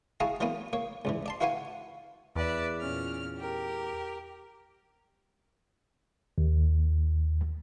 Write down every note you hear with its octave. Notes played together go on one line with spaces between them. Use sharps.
E4 F#4 G#4 F5 A5 A#5
E3 F#3 A#3 B3 C#4
A#3 C#5
C#2 G2 E3
D5 A5 C6
E4 F#4 B4 F5 F#5 G#5
E2 B4 D5 E5
A#2 C#4 F6
G4 A#4
D#2